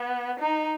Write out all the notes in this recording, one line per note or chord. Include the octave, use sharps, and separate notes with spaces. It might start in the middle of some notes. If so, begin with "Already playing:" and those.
Already playing: B3
D#4